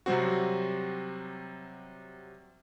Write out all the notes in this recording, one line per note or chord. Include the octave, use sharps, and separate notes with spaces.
C3 F#3 G3 C4 F#4